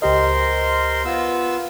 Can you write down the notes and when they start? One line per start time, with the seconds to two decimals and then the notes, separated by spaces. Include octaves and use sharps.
0.02 C#2 G4 A#4 C5 D#5 C6
1.05 B3 F4 E6